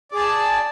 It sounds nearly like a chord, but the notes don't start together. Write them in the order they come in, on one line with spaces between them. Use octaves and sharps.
D5 G#4 A5